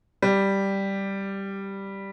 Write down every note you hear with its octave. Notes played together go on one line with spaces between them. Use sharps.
G3